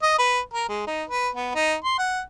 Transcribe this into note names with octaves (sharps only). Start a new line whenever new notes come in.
D#5
B4
A#4
G#3
D#4
B4
B3
D#4
C6
F#5